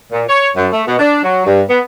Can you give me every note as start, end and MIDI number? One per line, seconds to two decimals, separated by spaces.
0.13 0.23 46
0.29 0.50 73
0.56 0.67 42
0.73 0.83 57
0.87 0.95 47
0.99 1.21 62
1.24 1.42 54
1.46 1.61 43
1.70 1.80 59